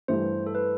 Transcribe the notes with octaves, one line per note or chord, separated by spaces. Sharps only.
G2 E3 A3 E4 G4 C5
A4
B4